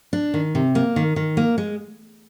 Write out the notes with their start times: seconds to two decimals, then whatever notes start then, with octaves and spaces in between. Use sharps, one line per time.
0.13 D4
0.34 D#3
0.55 C3
0.75 A#3
0.96 D#3
1.16 D#3
1.37 A#3
1.58 G#3